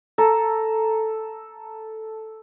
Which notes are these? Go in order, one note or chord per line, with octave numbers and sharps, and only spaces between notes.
A4 A5 A#5